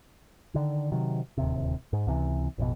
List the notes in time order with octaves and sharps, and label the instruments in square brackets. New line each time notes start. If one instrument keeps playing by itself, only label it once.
[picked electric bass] D3 D#3
C3 D#3 F#3
D1 D#2 C3
G#2
C#2 C3 E3
A1 F2 B2